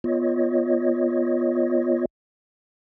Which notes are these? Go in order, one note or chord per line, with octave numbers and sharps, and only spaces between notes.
B3 F4 C#5 D#5